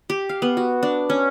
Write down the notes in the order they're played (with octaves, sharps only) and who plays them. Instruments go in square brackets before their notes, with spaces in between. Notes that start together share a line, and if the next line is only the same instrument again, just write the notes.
[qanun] G4
F5
B3
F#4
D4
C#4